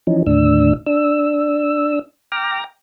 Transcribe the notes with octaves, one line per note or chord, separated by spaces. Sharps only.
E3 F3 C#4 D#4
D#2 A2 D3 D4 E6
D4 E6
G5 A#5 D6 F6 A#6